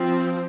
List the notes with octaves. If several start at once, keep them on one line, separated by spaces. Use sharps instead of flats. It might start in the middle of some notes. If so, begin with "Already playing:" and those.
Already playing: F3 C4